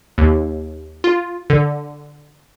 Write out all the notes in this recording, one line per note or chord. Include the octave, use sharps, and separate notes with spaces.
D#2
F4
D3